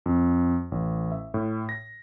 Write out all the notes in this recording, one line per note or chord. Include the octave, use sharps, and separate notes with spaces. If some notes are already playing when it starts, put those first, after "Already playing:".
F2
A1
E5
A2
A#6